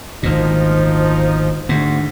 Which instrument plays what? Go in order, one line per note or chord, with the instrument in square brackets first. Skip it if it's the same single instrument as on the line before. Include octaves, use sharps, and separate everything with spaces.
[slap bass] G#1 D2 A#2 [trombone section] F3 D#4 [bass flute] C5
[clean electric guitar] D2 [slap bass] G#2 [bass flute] D4